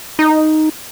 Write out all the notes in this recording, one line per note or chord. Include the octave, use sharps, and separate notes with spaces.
D#4